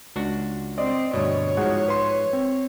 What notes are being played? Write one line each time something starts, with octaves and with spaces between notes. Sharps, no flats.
C#2 D4 F#4
C4 D5 D#5
D2 G2 B2 C#5
G#2 F3 F#4 G#4 F#5
B4 C6
C4